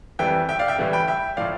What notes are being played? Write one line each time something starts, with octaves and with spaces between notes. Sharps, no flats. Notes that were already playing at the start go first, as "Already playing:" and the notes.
F2 E3 G3 E5 G5
E5 G5
D5 F5
E5 G5
A2 E3 G3
G5 B5
E5 G5
A2 F3 D5 F5